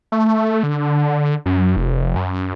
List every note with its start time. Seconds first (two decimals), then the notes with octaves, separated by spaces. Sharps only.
0.12 A3
0.63 D3
1.46 F#2
1.77 F1
2.16 F#2